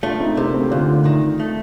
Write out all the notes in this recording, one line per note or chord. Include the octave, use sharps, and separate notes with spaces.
A3 D4 F4
C4 D#4
C3 A#3 D4
A3 C4
D2 D4 F4
D#3
A3